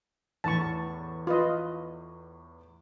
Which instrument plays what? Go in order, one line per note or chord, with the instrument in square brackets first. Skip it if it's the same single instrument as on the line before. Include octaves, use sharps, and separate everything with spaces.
[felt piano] E2 A2 [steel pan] A5 C#6
[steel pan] F4 B4 D#5